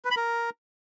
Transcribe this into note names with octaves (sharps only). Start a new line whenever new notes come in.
B4
B5
A#4